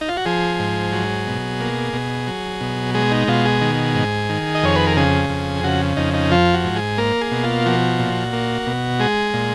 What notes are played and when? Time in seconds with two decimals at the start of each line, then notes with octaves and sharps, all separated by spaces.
0.01 D#4
0.09 F4
0.17 F#4
0.26 F3 G#4
0.59 G#2
0.92 F#3
1.27 B2
1.60 A#3
1.93 B2
2.27 F#3
2.61 B2
2.94 G#3 G#4
3.11 D#4
3.28 B2 F4
3.45 G#4
3.61 D#3
3.95 G#2
4.30 D#3
4.55 D#5
4.63 F2 C#5
4.76 B4
4.87 A#4
4.97 C#3 G#4
5.30 F2
5.64 C#3 F#4
5.97 F2 D#4
6.14 D#4
6.31 F3 F4
6.54 F#4
6.64 G#2
6.76 G#4
6.98 A#3 A#4
7.21 G#4
7.32 B2
7.43 F4
7.66 F3 F#4
7.99 A#2
8.33 A#3
8.67 B2
9.00 G#3 G#4
9.34 A#2